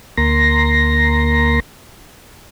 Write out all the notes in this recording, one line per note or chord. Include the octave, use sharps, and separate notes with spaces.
D2 A#3 A#5 C6 A#6